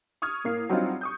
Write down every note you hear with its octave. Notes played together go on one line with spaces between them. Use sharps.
C#6 D#6 F6 G#6
A2 A#3 C7
F#3 G3 C4 D4 D#4 F4
C#6 D#6 G6